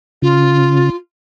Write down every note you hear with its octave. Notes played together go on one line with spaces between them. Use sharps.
C#3 F4